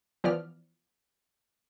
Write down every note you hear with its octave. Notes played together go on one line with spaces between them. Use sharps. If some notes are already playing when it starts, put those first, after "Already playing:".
E3 F3 B3 D5 F6